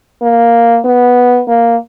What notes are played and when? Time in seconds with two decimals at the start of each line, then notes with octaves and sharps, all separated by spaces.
0.22 A#3
0.85 B3
1.48 A#3